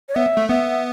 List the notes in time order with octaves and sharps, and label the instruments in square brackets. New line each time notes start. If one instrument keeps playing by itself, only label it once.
[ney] C#5
[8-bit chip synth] B3 [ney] E5
[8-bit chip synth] A3
[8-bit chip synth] B3 [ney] E5